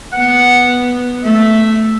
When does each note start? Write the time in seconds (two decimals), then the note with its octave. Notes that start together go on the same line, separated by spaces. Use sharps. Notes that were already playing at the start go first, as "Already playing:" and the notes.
0.13 B3 F#5
1.24 A3 E5